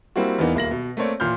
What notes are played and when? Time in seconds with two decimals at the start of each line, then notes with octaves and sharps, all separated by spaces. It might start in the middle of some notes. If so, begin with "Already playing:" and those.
0.16 G3 A#3 C4 E4 F#4
0.39 E2 E3 A#3 B3 D#4
0.55 D#1 A#3 A#6 F#7
0.71 B2
0.97 A3 A#3 C4 C#5 D5
1.20 A1 A#2 C6 F6 G6